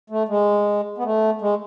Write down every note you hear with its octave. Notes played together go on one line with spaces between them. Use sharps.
A3
G#3
B3
A3
G#3